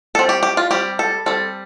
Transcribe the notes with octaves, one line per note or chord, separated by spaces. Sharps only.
G3 C4 A4
G4
G4
F4
G3 C4 G4
A4
G3 C4 A4